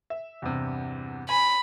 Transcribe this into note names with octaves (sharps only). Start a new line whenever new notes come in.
E5
E2 G2 C3
G#5 B5